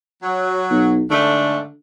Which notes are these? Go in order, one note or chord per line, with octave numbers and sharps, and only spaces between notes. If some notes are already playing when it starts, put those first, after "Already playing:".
F#3
B1
G#2 D3 A3 D4